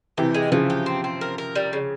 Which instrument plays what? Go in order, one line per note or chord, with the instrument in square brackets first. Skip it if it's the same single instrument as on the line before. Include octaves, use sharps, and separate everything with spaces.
[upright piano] C3 E3 [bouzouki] G4
[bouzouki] G#3
[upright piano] C#3 F3 [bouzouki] E3
[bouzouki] G4
C4
C4
A#4
A#4
G3
C#3